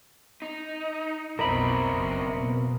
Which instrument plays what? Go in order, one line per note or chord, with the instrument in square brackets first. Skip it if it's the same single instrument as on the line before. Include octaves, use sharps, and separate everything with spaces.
[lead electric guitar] D#4
[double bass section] B1 F2 B2 [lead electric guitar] C4 E4 [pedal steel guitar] A#4 D#5 B5
[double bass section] F#1
B2 A#3